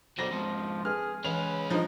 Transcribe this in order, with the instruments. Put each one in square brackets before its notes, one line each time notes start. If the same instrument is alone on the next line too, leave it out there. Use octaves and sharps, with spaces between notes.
[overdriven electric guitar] B2 F#3 [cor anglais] G3 [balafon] C5 A#5 [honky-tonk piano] A#6
[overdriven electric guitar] F2 G#2 [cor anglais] F3
[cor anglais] G#4 [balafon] B4 [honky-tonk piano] F6
[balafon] E3 [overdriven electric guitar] G#3 C#4 [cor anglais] B4 [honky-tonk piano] F7
[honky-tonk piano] F3 D#4 [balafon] G3 D4 A#5